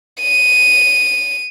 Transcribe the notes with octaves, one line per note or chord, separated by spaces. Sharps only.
D#7